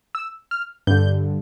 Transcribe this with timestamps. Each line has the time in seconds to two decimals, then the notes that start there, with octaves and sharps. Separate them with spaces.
0.15 E6
0.51 F6
0.87 G2 D3 G6